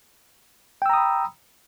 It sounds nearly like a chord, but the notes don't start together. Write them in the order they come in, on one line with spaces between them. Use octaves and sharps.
G5 E6 A#5 D#6 B5